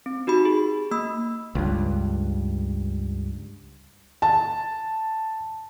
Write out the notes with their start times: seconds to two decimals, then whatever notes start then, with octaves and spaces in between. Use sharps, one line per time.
0.06 C4
0.27 D#4 F#4 G4 B5
0.45 G#4
0.91 A#3 B5 E6
1.55 C#2 G2
4.22 A5